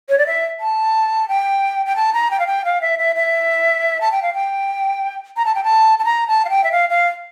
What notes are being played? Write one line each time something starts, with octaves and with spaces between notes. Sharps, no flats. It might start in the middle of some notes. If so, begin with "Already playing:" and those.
C#5
D5
E5
A5
G5
G5
A5
A#5
G5
F5
G5
F5
E5
E5
E5
A5
G5
F5
G5
A#5
A5
G5
A5
A5
A#5
A5
F5
G5
E5
F5
F5